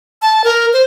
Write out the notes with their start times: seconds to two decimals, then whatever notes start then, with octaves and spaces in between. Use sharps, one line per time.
0.22 A5
0.44 A#4
0.73 C5